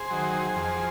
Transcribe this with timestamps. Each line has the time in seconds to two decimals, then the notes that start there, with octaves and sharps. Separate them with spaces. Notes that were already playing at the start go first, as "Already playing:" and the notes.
Already playing: G#4 C5
0.10 D#3 F#3
0.56 F2